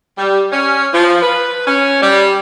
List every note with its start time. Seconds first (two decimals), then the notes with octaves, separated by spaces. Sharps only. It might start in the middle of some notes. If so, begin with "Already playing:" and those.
0.17 G3
0.52 C#4
0.92 F3
1.21 B4
1.66 C#4
2.01 G3